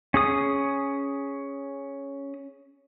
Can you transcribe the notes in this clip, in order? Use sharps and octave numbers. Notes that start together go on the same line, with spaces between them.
C#4 G#4 D#6